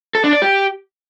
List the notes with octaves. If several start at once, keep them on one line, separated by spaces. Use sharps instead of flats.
A4
D4
D5
G4